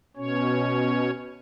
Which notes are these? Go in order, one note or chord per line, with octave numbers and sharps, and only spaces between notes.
B2 C#4 C#5